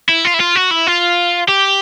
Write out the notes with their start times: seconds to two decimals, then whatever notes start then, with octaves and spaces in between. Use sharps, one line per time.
0.09 E4
0.25 F4
0.34 E4
0.40 F4
0.56 F#4
0.71 E4
0.87 F4
1.49 G4